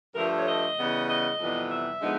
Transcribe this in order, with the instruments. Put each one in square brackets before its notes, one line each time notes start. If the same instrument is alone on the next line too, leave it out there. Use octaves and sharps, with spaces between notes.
[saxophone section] G2 D3 F3 A3 A#4
C#5
D#5
C#3 E3 G3 B3
D#5
F2 C3 E3 G3 B3
E5
D3 F3 G#3 B3 D#4